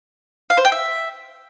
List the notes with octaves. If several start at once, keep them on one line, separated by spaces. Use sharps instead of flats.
F5
C5
G5
E5